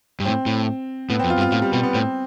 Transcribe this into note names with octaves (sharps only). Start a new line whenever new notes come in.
G2
A2 C4
A2
A2 B3
F2 C4
F4
G2
F4
A2 F4
G3
B2 G3
B3
A2 C4